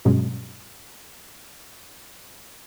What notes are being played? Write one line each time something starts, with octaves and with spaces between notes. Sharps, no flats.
G2 B2 F#3 G#3 C#4